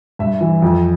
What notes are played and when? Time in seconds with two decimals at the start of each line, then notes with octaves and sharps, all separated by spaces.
0.19 G2 E5
0.41 E3
0.62 F2